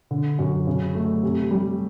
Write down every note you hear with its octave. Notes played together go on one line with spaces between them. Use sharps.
D3
F#2
C#3
A3
C3
G3